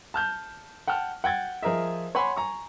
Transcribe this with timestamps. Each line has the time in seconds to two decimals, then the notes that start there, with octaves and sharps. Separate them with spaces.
0.14 A5 F6 G6
0.87 F#5 G5 A5 F6
1.24 F#5 G5 G#6 A6
1.63 F3 G#4 A#4 D#5 E5
2.15 C#5 F#5 G#5 B5 C6
2.37 G#5 A#5 C#6